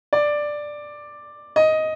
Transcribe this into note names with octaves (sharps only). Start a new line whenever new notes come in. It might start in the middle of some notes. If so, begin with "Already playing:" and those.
D5
D#5